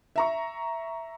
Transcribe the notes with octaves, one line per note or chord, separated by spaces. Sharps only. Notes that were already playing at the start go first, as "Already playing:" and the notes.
E5 A#5 C#6